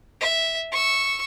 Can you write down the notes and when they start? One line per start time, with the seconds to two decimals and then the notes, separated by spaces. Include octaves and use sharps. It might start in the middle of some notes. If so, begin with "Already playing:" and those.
0.20 E5
0.72 C#6 E6